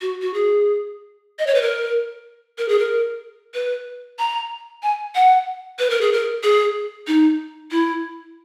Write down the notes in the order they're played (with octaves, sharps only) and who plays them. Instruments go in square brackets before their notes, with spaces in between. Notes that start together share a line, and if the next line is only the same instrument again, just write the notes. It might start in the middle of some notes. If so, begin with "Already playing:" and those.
[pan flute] F#4
F#4
G#4
D#5
C#5
B4
A#4
A#4
G#4
A#4
B4
A#5
G#5
F#5
B4
A#4
G#4
A#4
G#4
D#4
E4